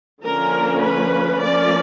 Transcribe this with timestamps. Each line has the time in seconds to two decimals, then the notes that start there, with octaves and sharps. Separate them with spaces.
0.24 D3 F3 A#3 C#4 A#4
0.82 B4
1.41 F3 A#3 C#4 D5